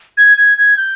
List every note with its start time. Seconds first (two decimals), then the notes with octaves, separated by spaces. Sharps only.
0.17 G#6
0.38 G#6
0.58 G#6
0.77 G6